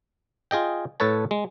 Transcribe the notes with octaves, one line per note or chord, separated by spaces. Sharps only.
F4 G#4 D#5 G5
A2 A4 B4 C#5 A5
G#3